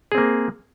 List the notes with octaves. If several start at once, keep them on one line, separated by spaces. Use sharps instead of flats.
A#3 C4 G#4